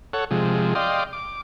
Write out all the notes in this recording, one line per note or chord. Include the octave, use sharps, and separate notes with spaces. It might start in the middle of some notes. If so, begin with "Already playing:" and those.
A4 C#5 F#5
C3 F3 G#3
D5 D#5 F5 G5 C6
D6